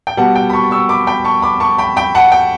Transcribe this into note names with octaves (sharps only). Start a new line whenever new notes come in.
G5
B2 G3 B3 F#5 A5
G5
B5
A5 C#6
C#6 E6
B5 D6
G5 B5
A5 C#6
B5 D6
A5 C#6
G5 B5
G5 B5
F#5 A5
G5